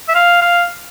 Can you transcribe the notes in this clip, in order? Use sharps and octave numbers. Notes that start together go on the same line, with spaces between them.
E5
F5
F5